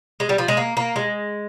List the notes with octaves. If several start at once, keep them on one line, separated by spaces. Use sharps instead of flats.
G#3
G3
F3
G#3
A#3
A#3
G#3